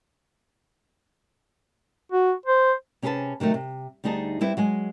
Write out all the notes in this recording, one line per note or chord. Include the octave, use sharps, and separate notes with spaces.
F#4
C5
C3 C#4 G4 G#4 B4 A5
C3 D#3 F#3 A3
C3
D2 G3 D#4 G#4 A5
G3 C4 E4 B4
F#3 G#3 G#5